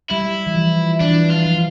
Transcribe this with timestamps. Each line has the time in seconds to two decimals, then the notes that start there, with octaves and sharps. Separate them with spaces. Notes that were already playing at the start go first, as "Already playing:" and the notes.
0.10 G3 E4
0.47 E3
0.55 F3
1.01 E3 D4
1.30 F4
1.45 F3